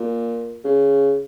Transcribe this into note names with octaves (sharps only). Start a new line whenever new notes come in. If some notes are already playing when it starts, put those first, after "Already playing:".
Already playing: A#2
C#3